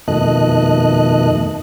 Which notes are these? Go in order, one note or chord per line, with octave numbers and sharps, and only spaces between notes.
F2 B2 D#3 A3 D#5 F#6